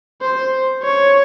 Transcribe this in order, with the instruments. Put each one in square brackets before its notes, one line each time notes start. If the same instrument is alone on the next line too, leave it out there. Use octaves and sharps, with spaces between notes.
[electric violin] C5
C#5